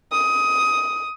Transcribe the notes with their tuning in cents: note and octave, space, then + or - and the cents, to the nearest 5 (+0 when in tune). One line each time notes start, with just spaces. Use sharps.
D#6 +15